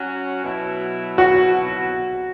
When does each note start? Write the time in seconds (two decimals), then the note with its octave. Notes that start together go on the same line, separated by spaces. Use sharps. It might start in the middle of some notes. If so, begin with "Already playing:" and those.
Already playing: F#3 C#4 F#4
0.43 B2 F#3 E4
1.18 F#4